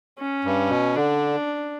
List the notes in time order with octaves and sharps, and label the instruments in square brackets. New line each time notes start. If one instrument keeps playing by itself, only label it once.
[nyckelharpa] C#4
[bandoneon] G2
B2
[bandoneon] D3 [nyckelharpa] D4